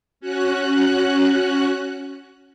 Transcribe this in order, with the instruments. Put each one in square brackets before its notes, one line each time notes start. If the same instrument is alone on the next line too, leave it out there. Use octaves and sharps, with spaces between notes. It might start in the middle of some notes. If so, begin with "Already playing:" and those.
[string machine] C#4 F#4 F#6